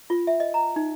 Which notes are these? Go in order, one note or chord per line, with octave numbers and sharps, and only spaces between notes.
F4
E5
D#5
A#5
D#4